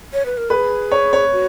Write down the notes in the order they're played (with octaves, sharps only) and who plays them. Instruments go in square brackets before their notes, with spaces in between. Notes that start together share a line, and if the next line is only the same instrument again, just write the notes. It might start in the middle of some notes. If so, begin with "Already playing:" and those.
[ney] C#5
B4
A#4
[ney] G#4 [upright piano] B4
[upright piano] C#5
C#5
[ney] F#4